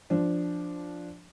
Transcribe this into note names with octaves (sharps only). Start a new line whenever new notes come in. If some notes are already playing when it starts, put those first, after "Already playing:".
F3 D4